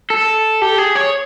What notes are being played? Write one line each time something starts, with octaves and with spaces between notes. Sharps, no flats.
A4
G4
G#4
C#5